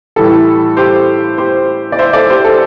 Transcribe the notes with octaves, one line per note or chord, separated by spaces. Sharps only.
A2 E3 G3 A4
G4 C5
G4 C5
D5
C5 E5
A4 D5
G4 C5
A4